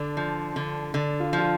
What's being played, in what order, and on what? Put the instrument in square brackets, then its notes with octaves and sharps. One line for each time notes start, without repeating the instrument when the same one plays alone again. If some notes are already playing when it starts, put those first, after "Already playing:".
Already playing: [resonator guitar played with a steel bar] D3 [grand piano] D4
[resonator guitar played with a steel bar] F3
D3
[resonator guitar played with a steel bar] D3 [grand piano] D4
[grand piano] F4
[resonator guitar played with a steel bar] F3
[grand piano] F4